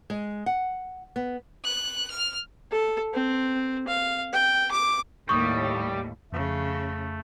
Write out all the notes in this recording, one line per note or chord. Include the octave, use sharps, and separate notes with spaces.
G#3
F#5
B3
F#6
F6
A4
C4
F5
G5
D6
D#2 A2 G3 C#6 D#6
F2 C#3 A3